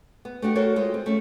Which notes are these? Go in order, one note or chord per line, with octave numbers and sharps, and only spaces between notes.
B3
A3 D4 F#4 G4
F#4 A4 A#4 C5 C#5
G#3 F4 C5
C4
A3 C#4